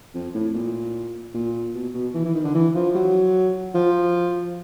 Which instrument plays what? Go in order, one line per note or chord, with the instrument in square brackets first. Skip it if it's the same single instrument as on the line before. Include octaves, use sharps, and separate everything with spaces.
[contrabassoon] F2
A2
A#2
A#2
B2
B2
E3
E3
D#3
D3
E3
F3
F#3
F3